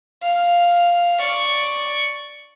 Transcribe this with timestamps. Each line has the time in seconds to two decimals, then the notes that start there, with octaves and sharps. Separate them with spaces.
0.23 F5
1.20 D5 C#6